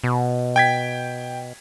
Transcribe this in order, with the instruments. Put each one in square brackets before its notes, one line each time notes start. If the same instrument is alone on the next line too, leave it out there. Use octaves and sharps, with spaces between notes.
[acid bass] B2
[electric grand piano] G5 G#6 B6